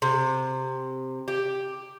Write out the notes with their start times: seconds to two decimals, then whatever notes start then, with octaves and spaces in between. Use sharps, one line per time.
0.02 C3
1.28 G4